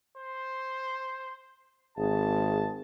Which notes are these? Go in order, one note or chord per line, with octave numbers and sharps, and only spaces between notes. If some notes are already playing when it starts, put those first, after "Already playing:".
C5
G#1 G#4 A5